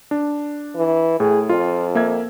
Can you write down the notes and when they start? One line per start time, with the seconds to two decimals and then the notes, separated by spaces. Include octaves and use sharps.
0.11 D4
0.76 E3
1.20 A2 G#4
1.49 F2 F4
1.95 A#3 E5 G#6